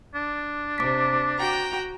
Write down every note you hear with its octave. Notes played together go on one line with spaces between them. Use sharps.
D4
C3 D6 B6
F#4 G5 A#5